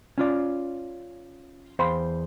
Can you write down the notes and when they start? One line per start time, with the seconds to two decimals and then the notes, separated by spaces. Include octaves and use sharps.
0.18 C#4 F4 D5
1.79 E2 C5 F5 G5 B5 C6